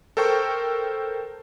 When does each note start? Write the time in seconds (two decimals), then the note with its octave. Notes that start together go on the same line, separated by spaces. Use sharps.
0.17 A4 A#4 C5 G5 C#6